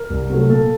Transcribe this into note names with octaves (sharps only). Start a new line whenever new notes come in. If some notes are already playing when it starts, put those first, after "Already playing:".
Already playing: A#4
C2
C3 F#3 A3
A#2 A4